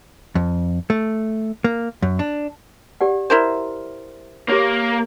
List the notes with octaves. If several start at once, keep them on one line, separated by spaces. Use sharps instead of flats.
F2
A3
A#3
F#2
D4
G4 D5 F#5
E4 A#4 C5
A#3 G4 C#5